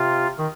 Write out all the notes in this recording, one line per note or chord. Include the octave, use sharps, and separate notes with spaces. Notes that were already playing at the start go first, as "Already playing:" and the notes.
Already playing: C3 F4
D#3